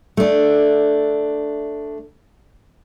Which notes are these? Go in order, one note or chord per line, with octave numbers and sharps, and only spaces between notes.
A3 D4